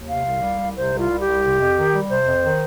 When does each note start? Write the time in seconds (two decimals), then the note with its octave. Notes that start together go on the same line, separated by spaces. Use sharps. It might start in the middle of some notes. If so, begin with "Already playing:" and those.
Already playing: D#2
0.09 C3 F5
0.25 C2
0.42 G3
0.60 C2
0.76 C3 C5
0.93 C2
0.98 F4
1.09 G3
1.20 G4
1.26 C2
1.43 C3
1.60 F2
1.77 D#3
1.93 G3
2.09 C3 C5
2.26 F2
2.43 D#3